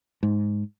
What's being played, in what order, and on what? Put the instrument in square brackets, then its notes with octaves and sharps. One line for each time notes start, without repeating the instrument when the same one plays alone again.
[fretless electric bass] G#2